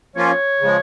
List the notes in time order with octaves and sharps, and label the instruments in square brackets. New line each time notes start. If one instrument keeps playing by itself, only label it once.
[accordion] F3 A#3 C#4 F4 [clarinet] C#5
[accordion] C#3 F3 G#3